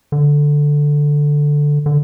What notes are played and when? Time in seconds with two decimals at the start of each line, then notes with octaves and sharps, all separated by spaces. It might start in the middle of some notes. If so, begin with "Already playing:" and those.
0.12 D3
1.86 D3